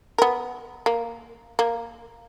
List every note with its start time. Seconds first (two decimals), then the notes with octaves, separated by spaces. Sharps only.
0.18 B3 A#4
0.86 A#3
1.59 A#3